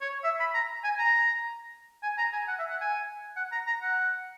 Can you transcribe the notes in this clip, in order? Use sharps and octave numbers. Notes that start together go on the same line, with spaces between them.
C#5
E5
B5
A#5
G#5
A#5
G#5
A#5
G#5
F#5
E5
F#5
G#5
F#5
A#5
A#5
F#5